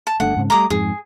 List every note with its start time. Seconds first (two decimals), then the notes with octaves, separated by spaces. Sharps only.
0.07 A5
0.20 G1 D3 A3 F#5
0.37 G#2 C#3 C4
0.50 G3 A3 A#5 D6 D#6
0.70 F2 G#2 G#4